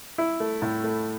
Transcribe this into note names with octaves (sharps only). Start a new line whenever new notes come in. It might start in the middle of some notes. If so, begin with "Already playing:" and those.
E4
A3
A2
A3